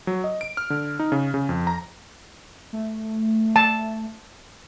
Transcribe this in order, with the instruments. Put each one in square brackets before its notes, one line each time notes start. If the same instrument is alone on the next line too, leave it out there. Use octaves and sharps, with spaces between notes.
[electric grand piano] F#3
D#5
D7
F6
D3
D#4
C#3
C#3
F2
A#5
[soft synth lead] A3
[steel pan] A5